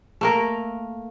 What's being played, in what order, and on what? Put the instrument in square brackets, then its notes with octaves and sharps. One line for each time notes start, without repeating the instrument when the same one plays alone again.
[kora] A3 A#3 A#4